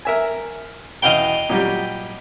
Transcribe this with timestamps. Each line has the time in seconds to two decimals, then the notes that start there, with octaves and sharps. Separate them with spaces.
0.05 A#4 E5 G#5
1.02 E2 B2 D#5 F5 G5
1.49 A#2 F#3 G3